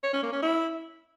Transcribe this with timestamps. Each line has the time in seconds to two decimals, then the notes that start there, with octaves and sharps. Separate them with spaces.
0.04 C#5
0.13 C#4
0.23 A#3
0.33 C#4
0.42 E4